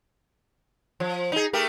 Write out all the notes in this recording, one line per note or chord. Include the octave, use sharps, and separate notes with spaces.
F3
D#4 G#4
A3 G4 A#4